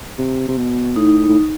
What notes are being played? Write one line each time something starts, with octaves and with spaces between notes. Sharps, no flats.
C3
C3
B2
A2 D#4
A2